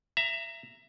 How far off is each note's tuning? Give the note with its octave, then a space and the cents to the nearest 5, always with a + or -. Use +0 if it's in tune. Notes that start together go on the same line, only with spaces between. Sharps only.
E5 +20 A#5 +0